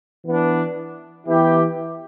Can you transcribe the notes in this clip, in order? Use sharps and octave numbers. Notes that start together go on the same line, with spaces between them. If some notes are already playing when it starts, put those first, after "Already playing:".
E3 B3 D4
E3 B3 E4 G4